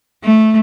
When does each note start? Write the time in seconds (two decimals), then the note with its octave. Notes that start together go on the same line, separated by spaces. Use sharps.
0.22 A3